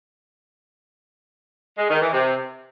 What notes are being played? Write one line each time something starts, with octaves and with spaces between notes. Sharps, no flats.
G#3
D#3
E3
C3